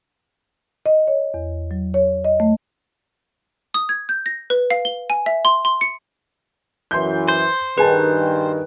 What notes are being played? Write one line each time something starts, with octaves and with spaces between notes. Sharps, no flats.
D#5
C#5
E2
F#3
C#5
D#5
A3
D#6
G#6
G6
A#6
B4
F5
G7
G#5
E5
C6
C6
C#7
F#2 E3 C6 G6
C5
G2 D#3 G#4 B4 G#5 A5